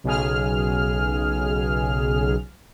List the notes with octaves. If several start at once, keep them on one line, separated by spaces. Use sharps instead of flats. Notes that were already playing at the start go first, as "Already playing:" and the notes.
B1 C#3 G#4 F6